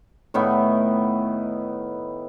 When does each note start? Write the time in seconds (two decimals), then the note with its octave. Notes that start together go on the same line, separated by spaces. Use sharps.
0.34 A2 D#3 B3